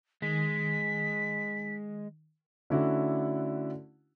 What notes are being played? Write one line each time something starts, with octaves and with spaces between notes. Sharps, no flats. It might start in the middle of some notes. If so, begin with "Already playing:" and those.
D#3 G#3 B6
D3 A3 C#4 D4 E4 F#4